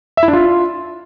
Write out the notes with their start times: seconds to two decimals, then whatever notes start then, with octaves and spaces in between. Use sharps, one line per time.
0.17 E5
0.23 E4
0.28 D4
0.33 F4